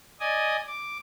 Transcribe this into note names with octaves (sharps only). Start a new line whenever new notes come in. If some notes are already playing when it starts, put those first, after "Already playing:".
D5 D#5 G#5 D#6
D6